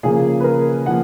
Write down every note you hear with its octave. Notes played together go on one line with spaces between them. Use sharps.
C#3 F3 A#3 G#4
B4
A#4
F3 A#3 F#5